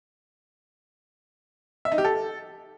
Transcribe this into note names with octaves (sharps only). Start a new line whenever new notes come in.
E5
D#4
G4
A4